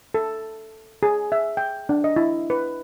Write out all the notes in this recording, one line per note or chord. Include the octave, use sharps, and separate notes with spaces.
A4
G#4
E5
G5
D4
D#5
E4
B4